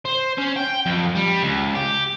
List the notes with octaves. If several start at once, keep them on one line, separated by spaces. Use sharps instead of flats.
C5
C#4
G5
F2
G3
C#2
G4